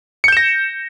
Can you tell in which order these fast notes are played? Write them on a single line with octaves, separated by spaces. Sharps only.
C#7 G6 E7 A#6